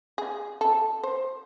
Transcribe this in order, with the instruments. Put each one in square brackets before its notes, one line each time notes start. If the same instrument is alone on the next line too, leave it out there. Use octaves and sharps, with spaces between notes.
[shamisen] G#4
A4
C5